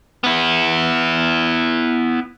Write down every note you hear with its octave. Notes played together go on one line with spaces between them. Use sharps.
B3 E4